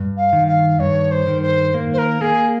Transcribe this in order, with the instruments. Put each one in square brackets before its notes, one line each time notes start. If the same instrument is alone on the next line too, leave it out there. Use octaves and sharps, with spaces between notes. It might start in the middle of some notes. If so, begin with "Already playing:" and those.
Already playing: [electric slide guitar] G2
[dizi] F5
[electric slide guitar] D#3
[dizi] F5
[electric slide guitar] G2 [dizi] C#5
[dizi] C5
[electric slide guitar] D#3
[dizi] C5
[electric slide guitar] A#3
[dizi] C5
A#4
[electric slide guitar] A#3 [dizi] G#4